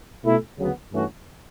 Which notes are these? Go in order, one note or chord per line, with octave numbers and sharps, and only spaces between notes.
B2 A3 E4
D2 C#3 F#3 B3
G2 E3 A3 C#4 F#4